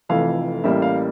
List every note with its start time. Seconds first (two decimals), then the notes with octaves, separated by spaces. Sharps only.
0.09 F1 F2 E3 A3 F5
0.64 A1 A2 G3 A#3 E5
0.82 F5